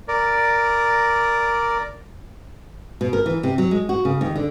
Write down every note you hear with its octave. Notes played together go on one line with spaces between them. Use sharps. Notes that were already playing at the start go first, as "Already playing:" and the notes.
A#4 D5
B2
A#4
E3
C3
F#3
G#3
F#4
C#3
D#2
D3